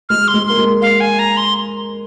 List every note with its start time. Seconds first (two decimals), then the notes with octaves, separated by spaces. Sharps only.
0.09 G#3 F6
0.28 C6
0.34 G#3
0.47 A#3 C6
0.58 G#3
0.82 F5
1.00 G#5
1.19 A#5
1.37 C6